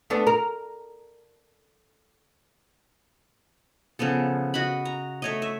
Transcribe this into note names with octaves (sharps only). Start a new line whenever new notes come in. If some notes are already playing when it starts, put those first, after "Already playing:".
A3 B3 D4
A#4
C#3 F3 B3 A4
F#4 D#5 B5
A#5
A3 C#5 D#5
E5